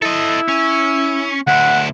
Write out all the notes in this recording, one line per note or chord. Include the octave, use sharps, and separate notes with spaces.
E4 A4 D#5
C#4
D2 E4 F#5